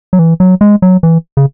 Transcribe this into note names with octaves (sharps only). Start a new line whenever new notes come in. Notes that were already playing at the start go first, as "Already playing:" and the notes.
F#3
E3
F#3
G#3
F#3
E3
C#3